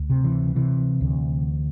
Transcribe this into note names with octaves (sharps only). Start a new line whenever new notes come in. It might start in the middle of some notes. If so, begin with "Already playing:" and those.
Already playing: D2
C3
E3
C3 E3
D2